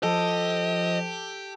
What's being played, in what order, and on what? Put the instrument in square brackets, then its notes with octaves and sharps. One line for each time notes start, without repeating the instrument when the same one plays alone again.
[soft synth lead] F3 [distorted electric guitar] G4 [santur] A4 [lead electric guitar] D#5